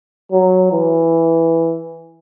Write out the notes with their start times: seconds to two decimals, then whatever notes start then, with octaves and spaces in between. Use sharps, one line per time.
0.32 F#3
0.72 E3